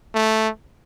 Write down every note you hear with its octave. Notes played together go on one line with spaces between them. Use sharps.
A3